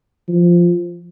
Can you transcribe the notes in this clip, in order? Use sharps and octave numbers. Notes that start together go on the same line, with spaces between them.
F3